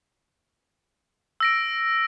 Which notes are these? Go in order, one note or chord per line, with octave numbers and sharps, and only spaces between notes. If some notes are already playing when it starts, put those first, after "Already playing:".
E6 A#6 D7